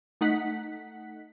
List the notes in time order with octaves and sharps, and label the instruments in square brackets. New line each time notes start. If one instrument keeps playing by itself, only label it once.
[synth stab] A3 D#4 F#5 B6